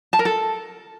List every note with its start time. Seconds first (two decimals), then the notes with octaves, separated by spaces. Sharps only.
0.13 A5
0.19 A#4
0.25 A4